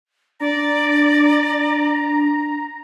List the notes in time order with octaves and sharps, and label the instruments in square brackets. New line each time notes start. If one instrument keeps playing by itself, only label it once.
[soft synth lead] D4 [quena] D5 [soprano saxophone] A#5